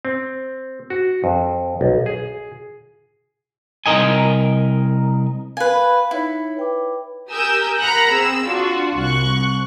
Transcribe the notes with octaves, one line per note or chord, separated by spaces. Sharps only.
C4
F#4
F2
B1
G#4
C2 F#3 A#4 D#5 G#5
B4 F5 G5 G#5
D#4 E4 C#5
B4 G5 D6
G4 A#4 G#5 D#6 E6 G6
A#4 F#5 A#5 B5 F#6 A#6
C4 G#4 E6
D4 F4 F#4
C2 C#6 F#6